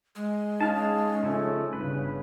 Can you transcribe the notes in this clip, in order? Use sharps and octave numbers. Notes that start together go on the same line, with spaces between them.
G#3
C#4 D#4 G#4 F5 A5
C#3 F3 A3
G1 C#3 B4